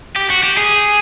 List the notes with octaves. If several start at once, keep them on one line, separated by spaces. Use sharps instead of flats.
G4
F#4
G4
G#4